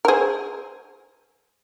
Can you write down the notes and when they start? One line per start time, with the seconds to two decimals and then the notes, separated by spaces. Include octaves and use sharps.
0.05 A#4
0.08 G#4 C5